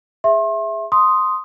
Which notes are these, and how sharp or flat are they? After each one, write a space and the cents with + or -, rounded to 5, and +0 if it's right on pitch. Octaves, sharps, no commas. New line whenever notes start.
G#4 -10 E5 +0 C6 +40
C6 +0 D#6 +0